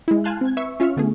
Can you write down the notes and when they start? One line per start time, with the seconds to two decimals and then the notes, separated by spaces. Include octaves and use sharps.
0.08 G#3 E4
0.24 F5 G#5 A5 C6 F6 F#6
0.41 C4 G#6
0.57 B4 E5 C#6 E6
0.80 C#4 F4 E5 C#6 F6
0.97 D3 A3 B3 G#4